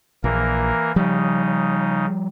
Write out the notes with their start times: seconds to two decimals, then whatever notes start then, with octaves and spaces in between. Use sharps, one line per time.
0.24 A#1 E3 A#3 A#4
0.96 C#3 F3 G3 D#4